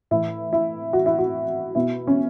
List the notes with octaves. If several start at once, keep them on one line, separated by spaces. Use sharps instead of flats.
A2 E3 E4
E4
F#4
E4
F#4
B2 E4
C#4